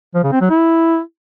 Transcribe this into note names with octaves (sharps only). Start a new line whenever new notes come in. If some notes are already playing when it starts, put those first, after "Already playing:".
F3
C#3
C4
F#3
E4